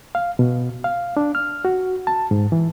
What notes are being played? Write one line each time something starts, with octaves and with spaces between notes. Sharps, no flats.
F5
B2
F5
D4
F6
F#4
A5
G#2
E3